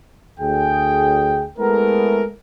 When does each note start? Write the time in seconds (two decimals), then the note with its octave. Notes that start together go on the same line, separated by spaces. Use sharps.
0.40 D2 G#4 G5
1.59 G#3 A3 B3 E4 G#4 A#4